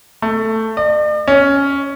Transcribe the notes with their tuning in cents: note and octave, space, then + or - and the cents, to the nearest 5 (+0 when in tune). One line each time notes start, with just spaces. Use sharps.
A3 +10
D5 +45
C#4 +5